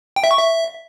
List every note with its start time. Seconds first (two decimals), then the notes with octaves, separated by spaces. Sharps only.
0.16 G5
0.24 E5
0.31 C#6
0.38 E5